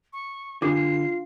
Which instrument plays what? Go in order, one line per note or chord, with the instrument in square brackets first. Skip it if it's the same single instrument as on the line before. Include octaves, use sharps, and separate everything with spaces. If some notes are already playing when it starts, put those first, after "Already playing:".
[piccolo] C#6
[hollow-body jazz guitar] D3 [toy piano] D4 D6 [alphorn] F4 [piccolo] C7